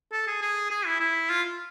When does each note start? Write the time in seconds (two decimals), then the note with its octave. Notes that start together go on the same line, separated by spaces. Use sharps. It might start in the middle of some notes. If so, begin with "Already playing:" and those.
0.12 A4
0.27 G#4
0.42 G#4
0.71 G#4
0.86 E4
1.00 E4
1.29 F4